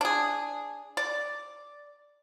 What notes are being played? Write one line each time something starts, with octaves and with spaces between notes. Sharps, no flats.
D4 G#4
D5